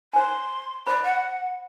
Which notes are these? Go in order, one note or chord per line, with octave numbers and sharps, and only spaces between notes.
C5 G#5 C6
C5 D5 B5
F#5